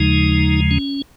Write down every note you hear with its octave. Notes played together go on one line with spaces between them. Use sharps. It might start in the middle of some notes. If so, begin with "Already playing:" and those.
Already playing: D#2 C#3 F3 G#3 D#4
C#4